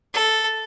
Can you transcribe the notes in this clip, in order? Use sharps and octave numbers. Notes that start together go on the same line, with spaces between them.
A4